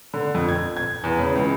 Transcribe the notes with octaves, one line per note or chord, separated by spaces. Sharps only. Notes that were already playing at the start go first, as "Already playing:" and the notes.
D3
F2
G#6
G#6
E2
C#3
C#2